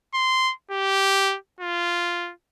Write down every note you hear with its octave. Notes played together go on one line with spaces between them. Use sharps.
C6
G4
F4